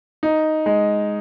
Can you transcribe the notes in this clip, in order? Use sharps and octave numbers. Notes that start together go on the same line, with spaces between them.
D#4
G#3